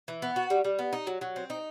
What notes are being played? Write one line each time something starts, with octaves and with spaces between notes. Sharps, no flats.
E3
B3
F#4
G3
G3
B3
D#4
F#3
F#3
C4
D#4